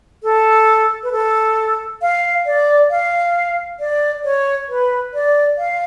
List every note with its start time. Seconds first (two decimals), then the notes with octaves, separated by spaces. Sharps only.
0.23 A4
1.03 B4
1.12 A4
2.02 F5
2.46 D5
2.90 F5
3.80 D5
4.24 C#5
4.68 B4
5.14 D5
5.58 F5